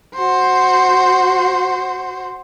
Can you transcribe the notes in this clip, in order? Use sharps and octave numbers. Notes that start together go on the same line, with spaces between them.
F#4 C5